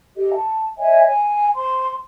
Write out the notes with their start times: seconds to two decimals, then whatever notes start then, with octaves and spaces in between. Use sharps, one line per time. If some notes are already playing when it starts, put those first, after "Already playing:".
0.16 G4 A4 D#5
0.35 A5
0.78 C#5 D#5 E5 G#5
1.05 G#5
1.55 C5 C6